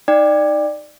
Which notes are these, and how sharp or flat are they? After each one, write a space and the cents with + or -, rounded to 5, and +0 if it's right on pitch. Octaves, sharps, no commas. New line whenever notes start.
D#4 +0 D5 +15 G5 +25